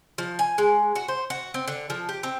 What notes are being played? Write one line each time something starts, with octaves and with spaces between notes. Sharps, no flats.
F3
G#5
G#3
F#4
C5
F#4
C4
D3
F3
G4
C4